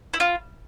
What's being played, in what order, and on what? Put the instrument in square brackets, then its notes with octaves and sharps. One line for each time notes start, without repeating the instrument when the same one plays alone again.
[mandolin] E4
F4